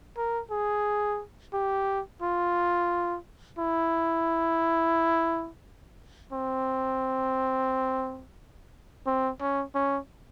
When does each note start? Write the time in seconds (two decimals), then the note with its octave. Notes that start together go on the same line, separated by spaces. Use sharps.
0.17 A#4
0.51 G#4
1.53 G4
2.22 F4
3.59 E4
6.33 C4
9.07 C4
9.40 C#4
9.75 C#4